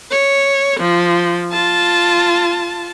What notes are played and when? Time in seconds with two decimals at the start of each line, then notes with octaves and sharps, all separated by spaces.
0.11 C#5
0.80 F3
1.52 F4 A5